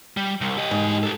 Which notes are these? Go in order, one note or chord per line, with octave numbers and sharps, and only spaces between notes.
G3
C2
G4 D#5
G#2
G4 A4